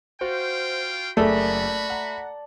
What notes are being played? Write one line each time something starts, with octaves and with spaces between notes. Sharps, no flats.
F4 F#4 C5 F5 G5
F#1 A3 F#4 G#4 A#4 D5 A5 B5
F#5 A#5